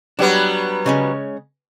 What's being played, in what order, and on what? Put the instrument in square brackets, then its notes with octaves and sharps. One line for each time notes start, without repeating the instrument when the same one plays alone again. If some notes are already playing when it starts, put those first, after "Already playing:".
[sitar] F#3 G3 B3 [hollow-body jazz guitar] D4
[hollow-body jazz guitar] C#3 G#3 C#4